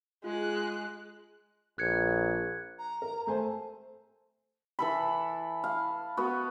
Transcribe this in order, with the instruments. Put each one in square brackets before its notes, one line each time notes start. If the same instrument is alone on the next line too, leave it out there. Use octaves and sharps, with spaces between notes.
[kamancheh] G#3 F#6 [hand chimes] F4 G#4
[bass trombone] A#1 [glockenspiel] F#6 G#6 C#7
[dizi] A#5
[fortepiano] A#4
[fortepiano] A3 C5 G#5 [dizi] A5
[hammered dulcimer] E3 A4 B5
F5
B3 F#4